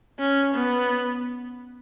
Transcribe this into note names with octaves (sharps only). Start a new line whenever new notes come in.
C#4
B3